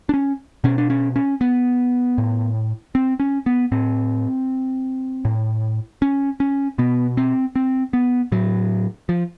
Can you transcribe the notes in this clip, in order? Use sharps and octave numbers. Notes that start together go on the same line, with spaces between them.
D4
C#4
B2 C#4
D4
C#4
C#4
B3
A2
C4
C#4
B3
A2 C4
A2
C#4
C#4
B2 B3
C4
C4
B3
A2 F#3
F3